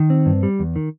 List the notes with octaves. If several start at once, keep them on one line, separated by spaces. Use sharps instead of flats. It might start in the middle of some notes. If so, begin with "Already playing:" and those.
Already playing: D#3
C4
G2
G3
E2
D#3